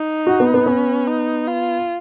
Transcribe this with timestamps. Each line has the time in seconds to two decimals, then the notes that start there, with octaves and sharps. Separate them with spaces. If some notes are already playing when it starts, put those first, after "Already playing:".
Already playing: D#4
0.27 F#4
0.40 B3
0.54 B3
0.66 B3 C#4
1.07 D#4
1.48 F4